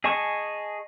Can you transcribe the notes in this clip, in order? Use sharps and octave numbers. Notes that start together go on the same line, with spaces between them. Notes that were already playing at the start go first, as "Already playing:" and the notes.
G#4 D#5 G#5 A5 C#6